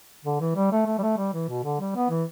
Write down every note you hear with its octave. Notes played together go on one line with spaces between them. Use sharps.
D3
E3
G3
A3
A3
G3
A3
G3
E3
B2
D3
G3
B3
E3